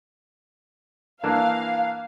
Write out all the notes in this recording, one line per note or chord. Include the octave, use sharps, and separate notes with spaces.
E3 A#3 D4 F5